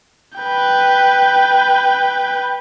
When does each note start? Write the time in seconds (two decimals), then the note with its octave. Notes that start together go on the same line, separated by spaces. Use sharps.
0.39 B4 G5